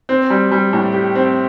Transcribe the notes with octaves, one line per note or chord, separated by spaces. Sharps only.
C4
G3
G3
A2
G4
C4